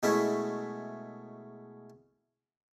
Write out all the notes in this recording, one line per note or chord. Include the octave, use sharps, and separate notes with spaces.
B2 G#3 A3 C#4 E4